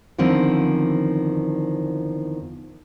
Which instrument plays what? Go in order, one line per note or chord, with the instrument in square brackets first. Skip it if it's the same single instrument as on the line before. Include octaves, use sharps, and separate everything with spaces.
[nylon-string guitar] E2 D3 D#3 F3 C4